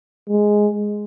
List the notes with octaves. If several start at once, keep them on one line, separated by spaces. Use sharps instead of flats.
G#3